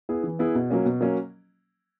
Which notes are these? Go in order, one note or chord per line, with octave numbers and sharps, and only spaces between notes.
B3 E4 G#4
E3
B3 E4 G#4
B2
F#3 A#3 C#4
B2
F#3 A#3 C#4